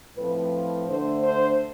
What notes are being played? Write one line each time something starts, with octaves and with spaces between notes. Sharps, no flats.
A2 F3 C4 B4
D3 A3 D4 C5
C5